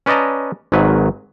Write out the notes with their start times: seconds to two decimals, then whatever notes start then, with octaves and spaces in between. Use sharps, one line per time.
0.06 C#4 B4 D5 D#5 A5 A#5
0.72 G#1 G#2 D#3 F#3 B4